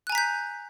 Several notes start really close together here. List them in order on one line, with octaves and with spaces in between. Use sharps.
F#6 G#5 A#5 B6 G6